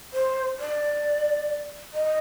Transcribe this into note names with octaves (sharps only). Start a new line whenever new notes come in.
C5
D5
D#5